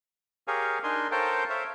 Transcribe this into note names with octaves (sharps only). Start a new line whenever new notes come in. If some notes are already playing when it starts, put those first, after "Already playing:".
G4 G#4 A#4 C#5 F5 G#5
D4 D#4 A#4 G#5 C6
A4 A#4 C5 C#5 F5 G5
C5 C#5 E5 F5